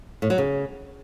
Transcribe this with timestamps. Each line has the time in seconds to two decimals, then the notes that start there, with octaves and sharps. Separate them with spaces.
0.22 A2
0.30 F#3
0.38 C#3